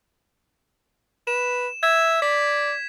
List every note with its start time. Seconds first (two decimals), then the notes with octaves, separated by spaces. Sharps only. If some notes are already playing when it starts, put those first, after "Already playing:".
1.27 B4 E7
1.83 E5 G#6 E7
2.22 D5 B6